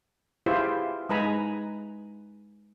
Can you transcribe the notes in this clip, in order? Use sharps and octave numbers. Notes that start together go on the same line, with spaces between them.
E4 F4 G4 G#4 B4 C5
G#3 D#4 B4 G#5 A#5 B5